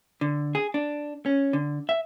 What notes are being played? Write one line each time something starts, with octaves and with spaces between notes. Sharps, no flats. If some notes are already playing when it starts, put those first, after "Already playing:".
D3
G#4
D4
C#4
D3
E5